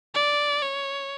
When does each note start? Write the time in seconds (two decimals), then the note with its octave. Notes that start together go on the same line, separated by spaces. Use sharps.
0.15 D5
0.62 C#5